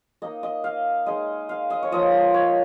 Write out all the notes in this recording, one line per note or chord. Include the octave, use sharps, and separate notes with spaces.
A#3 D#4 D#5
D#5
F5
G#3 D#4 D#5
F5
D#5
C#5
F3 A#3 F4 D#5
C#5